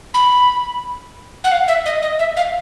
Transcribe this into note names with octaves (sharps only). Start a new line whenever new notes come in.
B5
F#5
F5
E5
D#5
D#5
E5
F5